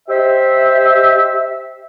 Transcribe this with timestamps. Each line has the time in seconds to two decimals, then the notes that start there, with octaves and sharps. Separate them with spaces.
0.09 G4 C5 D#5 E5